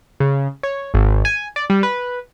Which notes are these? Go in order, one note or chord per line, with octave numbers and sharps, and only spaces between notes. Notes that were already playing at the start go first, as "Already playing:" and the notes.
C#3
C#5
G#1
G#5
D5
G3
B4